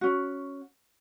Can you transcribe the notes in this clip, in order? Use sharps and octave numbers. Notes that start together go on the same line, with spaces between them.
C#4 F#4